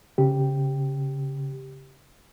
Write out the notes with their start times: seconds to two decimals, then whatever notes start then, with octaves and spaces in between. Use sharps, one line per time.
0.18 C#3 G4